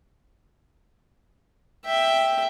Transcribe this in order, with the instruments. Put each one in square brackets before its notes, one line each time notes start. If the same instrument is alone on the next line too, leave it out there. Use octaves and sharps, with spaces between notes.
[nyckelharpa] E5 G5